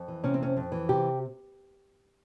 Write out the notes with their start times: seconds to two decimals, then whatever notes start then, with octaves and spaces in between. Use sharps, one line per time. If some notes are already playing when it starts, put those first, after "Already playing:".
Already playing: F2
0.08 E3
0.24 C3 C#4
0.34 C4
0.40 F2 C#4
0.57 F2
0.72 E3
0.89 C3 G4